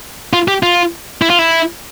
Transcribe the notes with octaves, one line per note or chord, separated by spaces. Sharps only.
F4
G4
F4
E4
F4
E4